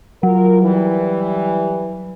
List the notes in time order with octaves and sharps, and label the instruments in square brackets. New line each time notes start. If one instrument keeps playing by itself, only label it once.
[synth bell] F#3 [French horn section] F4 A#4
[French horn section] E3 G3